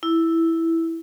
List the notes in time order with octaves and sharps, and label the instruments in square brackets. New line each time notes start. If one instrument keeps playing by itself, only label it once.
[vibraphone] E4